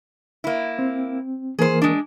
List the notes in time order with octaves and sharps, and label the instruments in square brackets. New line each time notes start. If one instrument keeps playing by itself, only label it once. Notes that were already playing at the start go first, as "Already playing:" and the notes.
[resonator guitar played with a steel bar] A#3 E4
[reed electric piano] C4
[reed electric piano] E3 A#3 A#4 [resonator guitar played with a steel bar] G#4 C5
[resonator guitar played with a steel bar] G#3 D4